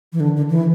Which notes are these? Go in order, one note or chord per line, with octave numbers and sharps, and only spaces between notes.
E3
D3
D3
E3